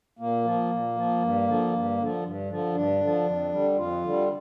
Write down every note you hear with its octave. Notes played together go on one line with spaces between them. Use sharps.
A#2 A#3
F3
A#2
F3
G2
D3 F3
G2
D3 F3
G2
D3 F3
G2 D4
D3 F3
F2
D3 G3
F2 F4
D3 G3